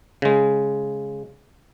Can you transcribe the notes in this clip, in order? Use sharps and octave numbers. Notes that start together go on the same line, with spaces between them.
C#3 G#3